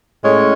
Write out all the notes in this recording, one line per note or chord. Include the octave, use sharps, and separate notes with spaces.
A2 G#3 C#4